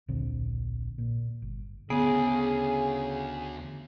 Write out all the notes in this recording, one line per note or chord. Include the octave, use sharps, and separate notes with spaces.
D1 A#1 D3 C4
A#2
G1
D2 C#3 B3 G#4